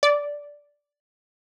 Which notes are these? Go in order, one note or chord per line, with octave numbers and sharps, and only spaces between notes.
D5